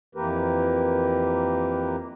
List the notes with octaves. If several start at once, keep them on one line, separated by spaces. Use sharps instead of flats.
F2 E3 A#3 G4 A#4 B4